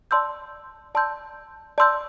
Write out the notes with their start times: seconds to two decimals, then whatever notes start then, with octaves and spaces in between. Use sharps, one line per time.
0.11 D5 A5 C6 E6 G6
0.95 D5 A5 C6 E6 G6
1.78 D5 A5 C6 E6 G6